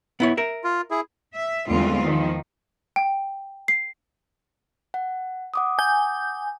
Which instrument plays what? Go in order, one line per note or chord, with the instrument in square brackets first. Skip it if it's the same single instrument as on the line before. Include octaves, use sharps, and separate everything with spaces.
[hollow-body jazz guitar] B3 E4 C#5
A#4 E5
[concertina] F4
E4 G#4
[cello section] E5
E2 D3 G3 G#3 C4 F4
D#3 F3
[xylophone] G5
C7
[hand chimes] F#5
F#5 D6 D#6
[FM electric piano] G#5 G6